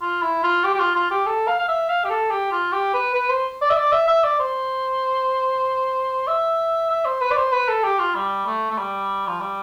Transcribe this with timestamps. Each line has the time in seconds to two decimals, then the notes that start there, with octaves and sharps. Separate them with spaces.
0.02 F4
0.22 E4
0.43 F4
0.64 G4
0.74 G4
0.79 F4
0.96 F4
1.11 G4
1.27 A4
1.47 F5
1.59 F5
1.68 E5
1.89 F5
2.05 G4
2.10 A4
2.31 G4
2.52 F4
2.72 G4
2.94 B4
3.14 B4
3.29 C5
3.61 D5
3.70 E5
3.77 D5
3.92 E5
4.08 E5
4.24 D5
4.39 C5
6.27 E5
6.90 E5
7.05 C5
7.21 B4
7.31 D5
7.37 C5
7.53 B4
7.68 A4
7.84 G4
7.99 F4
8.15 G3
8.47 A3
8.70 A3
8.78 G3
9.27 F3
9.40 G3